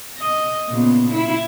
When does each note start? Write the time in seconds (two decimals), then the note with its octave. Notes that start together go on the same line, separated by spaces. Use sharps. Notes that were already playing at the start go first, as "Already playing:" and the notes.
0.19 D#5
0.69 A#2 C#3 B3
1.13 E4